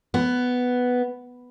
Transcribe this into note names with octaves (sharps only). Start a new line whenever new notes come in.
B3